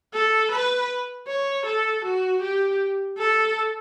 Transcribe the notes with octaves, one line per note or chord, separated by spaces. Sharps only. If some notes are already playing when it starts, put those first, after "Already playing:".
A4
B4
C#5
A4
F#4
G4
A4